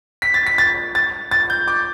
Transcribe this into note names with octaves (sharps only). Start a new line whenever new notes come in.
B6
A6
B6
A6
A6
A6
G6
D6